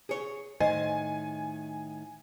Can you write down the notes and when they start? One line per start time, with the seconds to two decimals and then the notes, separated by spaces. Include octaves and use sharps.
0.09 G#4 C#5
0.60 A2 D#3 C5 D#5 G#5